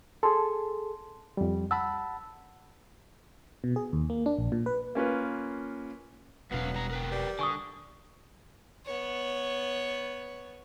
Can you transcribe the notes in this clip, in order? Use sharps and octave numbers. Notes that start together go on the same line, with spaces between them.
G#4 A4 A5 C6
F2 G3
F#5 A5 B5 E6
B2
G#4
D#2
A#3
D4
A#1
A#2
B4
A#3 C#4 F4 B4
E1 F#2 F#3 B3 F5
G3 A#5
A#4 B4 G5
G3
D3 G#5 C#6 D#6
B3 C#5